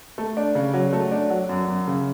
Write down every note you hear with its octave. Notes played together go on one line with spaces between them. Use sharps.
A3
D4
C#3
F#3
A3
D4
F#3
F#2
F#2
C#3